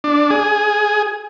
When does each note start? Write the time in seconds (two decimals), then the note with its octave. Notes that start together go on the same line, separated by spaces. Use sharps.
0.04 D4
0.31 G#4